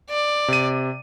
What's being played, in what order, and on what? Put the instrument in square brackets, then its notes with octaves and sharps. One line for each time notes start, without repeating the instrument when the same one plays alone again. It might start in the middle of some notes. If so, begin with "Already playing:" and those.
[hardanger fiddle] D5
[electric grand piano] C3 D#7